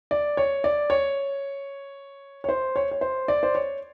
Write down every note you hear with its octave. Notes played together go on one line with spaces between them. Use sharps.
D5
C#5
D5
C#5
C#5
C5
C#5
C#5
C5
D5
C5
C#5